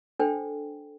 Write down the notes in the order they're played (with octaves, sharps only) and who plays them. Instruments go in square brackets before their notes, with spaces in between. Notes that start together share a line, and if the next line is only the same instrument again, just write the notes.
[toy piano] D4 A4 C5 G5